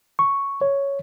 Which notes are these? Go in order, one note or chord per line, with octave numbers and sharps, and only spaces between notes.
C#6
C#5